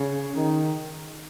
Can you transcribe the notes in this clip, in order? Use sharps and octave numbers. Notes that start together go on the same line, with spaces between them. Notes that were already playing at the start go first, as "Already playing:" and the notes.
Already playing: C#3
D#3